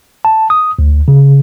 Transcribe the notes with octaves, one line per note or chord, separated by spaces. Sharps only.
A5
D#6
D2
C#3